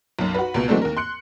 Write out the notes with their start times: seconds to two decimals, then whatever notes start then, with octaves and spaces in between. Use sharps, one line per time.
0.19 B1 F#2
0.34 F#4 B4
0.54 C#2 B2
0.68 E3 F#3 G#3 A3 C4 D4
0.82 D#2 A#4
0.97 C6 F#6 C#7